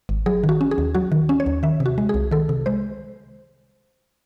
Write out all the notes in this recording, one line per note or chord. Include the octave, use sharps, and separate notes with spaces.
G#1
F#3 G#4
D#3
F#4
C#4
G#4
D#2
F#3 F#4
D#3
C#4
C#5
D#2
D#3 E5
C3
F#4
G#3
C2 G#4
D#3 A4
C3
G#3 C5